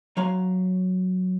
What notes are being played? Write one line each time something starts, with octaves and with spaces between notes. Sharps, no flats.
F#3 C#5 F5 A#5 C6